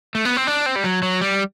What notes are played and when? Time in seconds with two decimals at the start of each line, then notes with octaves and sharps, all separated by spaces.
0.15 A3
0.25 B3
0.37 C4
0.47 D4
0.66 C4
0.76 G3
0.84 F#3
1.03 F#3
1.21 G3